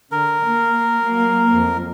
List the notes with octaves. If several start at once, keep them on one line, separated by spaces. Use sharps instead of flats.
D3 A#4
A#3
F#3 A#3
F2